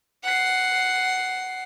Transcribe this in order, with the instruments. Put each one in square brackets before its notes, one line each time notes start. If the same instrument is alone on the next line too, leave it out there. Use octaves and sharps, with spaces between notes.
[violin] F#5 C7